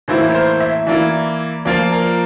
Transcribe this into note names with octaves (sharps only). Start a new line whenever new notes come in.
A2 E3 A#3 E4 C5
A#4
C5
E5
E3 A#3 E4 D5
F3 A#3 F4 D5
A#4